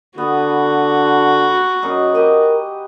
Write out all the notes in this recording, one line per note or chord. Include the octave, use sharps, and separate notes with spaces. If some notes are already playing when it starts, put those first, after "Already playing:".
D3 B3 F#4
F#2 D#4 G#4
G4 A#4 D#5